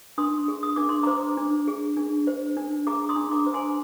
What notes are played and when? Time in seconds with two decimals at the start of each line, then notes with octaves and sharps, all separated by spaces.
0.18 D4 C6 D#6
0.48 G#4
0.63 D#6
0.76 D4 D6
0.89 C6
1.03 C5 A#5 D6
1.37 D4
1.68 G#4
1.97 D4
2.27 C5
2.57 D4
2.87 G#4 A#5 D6
3.09 C6 D#6
3.16 D4
3.32 A#5 D6
3.46 C5
3.54 G#5 C6